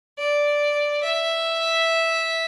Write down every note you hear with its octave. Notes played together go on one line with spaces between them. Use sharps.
D5
E5